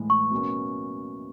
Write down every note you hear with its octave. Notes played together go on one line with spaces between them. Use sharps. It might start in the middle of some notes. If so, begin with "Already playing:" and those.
Already playing: A2 E3 G#3
C#6
B2 F#3 A#3 C#4